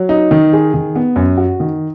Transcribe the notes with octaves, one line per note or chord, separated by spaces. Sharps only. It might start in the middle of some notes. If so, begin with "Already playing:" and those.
Already playing: F#3
D#4
D#3
G#4
D#3
B3
F#2
F#4
D#3